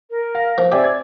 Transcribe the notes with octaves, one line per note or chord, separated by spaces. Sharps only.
A#4
F5
F3
C4 G4 D5 E5 G#5
G#6